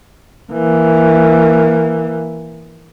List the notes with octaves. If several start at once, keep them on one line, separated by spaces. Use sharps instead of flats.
E3 A#3